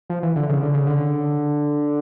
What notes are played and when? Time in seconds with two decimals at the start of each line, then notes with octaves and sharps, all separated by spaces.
0.10 F3
0.23 E3
0.36 D3
0.49 C#3
0.63 D3
0.74 C#3
0.87 D3